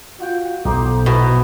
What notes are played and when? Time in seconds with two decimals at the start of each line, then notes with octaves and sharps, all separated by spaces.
0.20 F4 F#4 G5
0.65 B1 D#4 G4 A4 C5
1.06 B2 E4 F#4